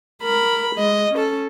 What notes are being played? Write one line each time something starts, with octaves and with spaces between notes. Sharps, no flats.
A#4 B5
G#3 D#5
C#4 A4